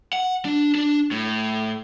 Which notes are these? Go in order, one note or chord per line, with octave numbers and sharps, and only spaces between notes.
F#5
D4
D4
A2